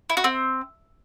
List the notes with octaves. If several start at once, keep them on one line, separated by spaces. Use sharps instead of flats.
E4
F#4
C4